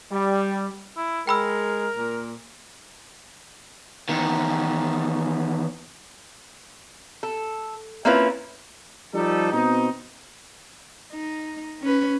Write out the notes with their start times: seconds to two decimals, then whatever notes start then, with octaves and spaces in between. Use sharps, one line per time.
0.11 G3
0.97 E4
1.27 G#3 A#4 G5 B5 E6
1.95 A#2
4.09 E2 D#3
7.23 A4
8.05 A#3 C4 C#4 E4 F4 B4
9.13 F3 G3 D#4 A4
9.51 B2 C4 D#4
11.12 D#4
11.82 C#4 B4